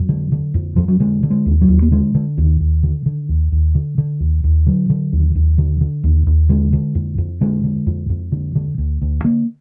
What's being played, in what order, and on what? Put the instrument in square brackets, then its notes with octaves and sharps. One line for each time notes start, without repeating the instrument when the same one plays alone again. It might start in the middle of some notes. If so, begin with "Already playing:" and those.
Already playing: [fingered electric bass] F2 F#3
D3
D3
F2
F2 F3
F#3
D3 G#3
D3
G#3
D#2
F#3
D#2
A#3
D3 G#3
D3
D#2 D#3
D#2
D3
D3
D#2
D#2
D3
D3
D#2
D#2
D3 F#3
D3
D#2
D#2
D3
D3
D#2
D#2
D3 G#3
D3
F2
F2
D3 G#3
D3
F2
F2
D3
D3
D2
D2
D3 A#3